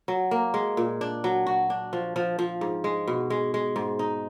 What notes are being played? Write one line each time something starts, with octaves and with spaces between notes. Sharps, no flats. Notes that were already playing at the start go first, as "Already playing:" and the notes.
F#3
A#3
G#3
A#2
D4
F#3
F#4
D4
F3
F3
F3
G#2
G#3
B2
G#3
G#3
G#2
D#4